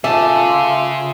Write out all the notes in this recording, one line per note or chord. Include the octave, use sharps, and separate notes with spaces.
C#3 A3 F4 E5 G#5 A5 D6